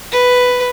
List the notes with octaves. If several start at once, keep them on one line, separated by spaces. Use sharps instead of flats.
B4